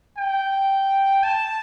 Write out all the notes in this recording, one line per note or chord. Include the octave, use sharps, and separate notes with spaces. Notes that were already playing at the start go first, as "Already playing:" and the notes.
G5
A5